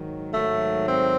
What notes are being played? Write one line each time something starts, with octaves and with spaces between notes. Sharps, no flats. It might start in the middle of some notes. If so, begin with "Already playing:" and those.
Already playing: G#2 D#3 F#3
G#2 D#3 F#3 A3
C4